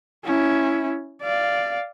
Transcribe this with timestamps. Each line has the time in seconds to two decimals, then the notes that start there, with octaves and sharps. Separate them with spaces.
0.24 C#4 E4
1.23 D5 F5